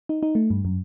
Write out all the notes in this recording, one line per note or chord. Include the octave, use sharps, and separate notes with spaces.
D#4
D#4
A3
G2
F#2